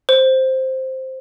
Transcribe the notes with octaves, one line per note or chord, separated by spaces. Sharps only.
C5